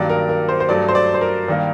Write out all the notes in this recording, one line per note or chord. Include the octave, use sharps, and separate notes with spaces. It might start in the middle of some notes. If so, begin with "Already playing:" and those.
Already playing: G2 D#3 F#3 A#3 D5
A#4
A#4
C5
C5
G2 F#3 A3 D5
C5
D5
C5
A#4
G2 D#3 G3 A#3